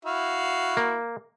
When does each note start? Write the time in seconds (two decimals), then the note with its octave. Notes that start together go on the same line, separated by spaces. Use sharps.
0.05 E4 F#4 F5
0.77 A#3